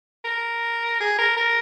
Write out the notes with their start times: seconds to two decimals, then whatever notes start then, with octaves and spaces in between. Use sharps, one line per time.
0.25 A#4
1.00 G#4
1.18 A#4
1.37 A#4